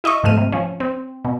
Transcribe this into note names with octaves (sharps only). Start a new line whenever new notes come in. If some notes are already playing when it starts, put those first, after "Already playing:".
E4 D#5 E5 C#6
G#2 C3 F3 A3 F6 D#7
C3
F3 C#4
C4
B2